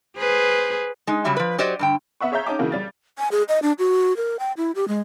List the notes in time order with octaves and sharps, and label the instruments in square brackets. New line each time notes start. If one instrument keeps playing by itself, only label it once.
[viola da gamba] G#4 B4 C5
[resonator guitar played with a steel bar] G#3 D#4
C#3 F#3 G3 G4 E5
F3 B4
F#3 G4 C5 D5 D#5
G2 D3 G5
[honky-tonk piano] B3 E5 F#5 C#6
G#4 C#5 E5 F5 A#5 G6
C#4 D#4 D#5 G5 A5 D6
C#3 E3 A#3 F#4
G3 A6
[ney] G#5
G#4
D#5
D4
F#4
A#4
G5
E4
G4
G#3